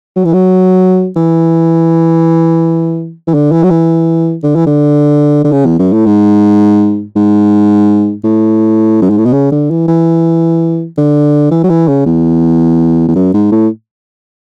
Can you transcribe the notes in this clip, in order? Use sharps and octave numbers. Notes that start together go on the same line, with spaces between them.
F#3
E3
F#3
E3
E3
D3
E3
F#3
E3
D3
E3
D3
D3
C#3
E2
F#2
A2
G#2
G#2
A2
F#2
G#2
A2
B2
C#3
D3
E3
E3
D3
E3
F#3
E3
C#3
E2
E2
F#2
G#2
A2